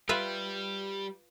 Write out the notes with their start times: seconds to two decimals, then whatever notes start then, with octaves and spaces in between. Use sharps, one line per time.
0.09 G3 F4 G4 B4 E5